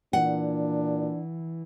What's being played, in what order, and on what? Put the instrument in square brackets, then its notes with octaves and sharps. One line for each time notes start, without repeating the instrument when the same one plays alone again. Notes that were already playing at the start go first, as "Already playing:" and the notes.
[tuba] A#2 [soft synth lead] E3 [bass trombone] D4 [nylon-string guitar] F#5